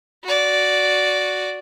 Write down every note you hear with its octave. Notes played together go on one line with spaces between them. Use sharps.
F#4 D5